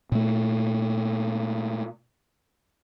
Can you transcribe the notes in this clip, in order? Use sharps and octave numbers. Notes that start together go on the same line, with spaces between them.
A#2 A3